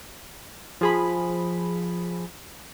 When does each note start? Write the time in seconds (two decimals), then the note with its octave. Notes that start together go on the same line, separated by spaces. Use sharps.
0.81 F3 G#4 B5